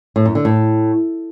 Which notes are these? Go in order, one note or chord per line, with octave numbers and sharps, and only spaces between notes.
A2
F#2
D3
A2